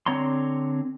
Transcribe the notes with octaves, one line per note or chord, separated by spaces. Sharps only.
D3 C4 C#5 A#5 C6